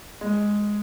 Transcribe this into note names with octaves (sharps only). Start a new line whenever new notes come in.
G#3